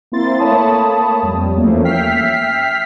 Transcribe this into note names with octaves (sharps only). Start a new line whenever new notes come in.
A#3 C4 E4 C6 A6
A3 A#3 C#5 A5 B5 D#6
F2 G3
E2 F3 A3 A#3 C#4
E5 G5 F6 B6 C7